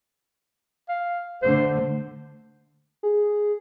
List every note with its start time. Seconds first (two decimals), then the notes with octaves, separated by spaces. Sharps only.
0.89 F5
1.42 D3 A3 C5
3.03 G#4